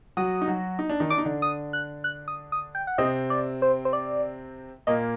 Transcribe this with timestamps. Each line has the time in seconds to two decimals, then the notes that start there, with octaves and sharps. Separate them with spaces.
0.17 F#3 F#4 D#6
0.42 D#4
0.48 F#3 F#4
0.79 D#4
0.90 D4
1.00 D#3 D#4
1.10 D4 D6
1.18 D#4
1.25 D3 D4
1.42 D#6
1.73 F#6
2.04 F#6
2.28 D#6
2.52 D#6
2.75 G5
2.87 F#5
2.98 C3 C4 D#5
3.30 D5
3.62 C5
3.85 C5
3.93 D5
4.87 A#2 A#3 D#5